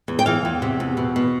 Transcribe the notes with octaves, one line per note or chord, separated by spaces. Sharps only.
E2
G5
E3 F5
E2
C3
E2
B2
B2